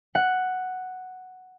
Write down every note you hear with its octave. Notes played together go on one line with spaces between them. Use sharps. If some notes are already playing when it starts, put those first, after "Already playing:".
F#5